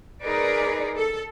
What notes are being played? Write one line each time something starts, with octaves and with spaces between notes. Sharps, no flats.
D#4 G#4 A#4 B4 D5
A4